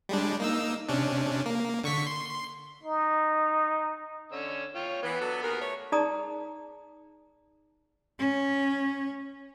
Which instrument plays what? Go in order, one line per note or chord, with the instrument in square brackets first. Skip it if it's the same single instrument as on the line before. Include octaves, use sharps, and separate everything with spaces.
[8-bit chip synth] G3 G#3 D4
A#3 D#4 E6
C3 C#4 D4
A#3
D3 C#6 B6
C6
[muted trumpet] D#4
[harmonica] D3 C#4 E6
F4 C#5 G5
[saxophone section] E3 [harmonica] B3 B4
[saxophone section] F#3 D4 A4
D#2 G#4 A#4
A3 C#5
[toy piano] D#4 G#4 D5 A5 A#5 D#6
[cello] C#4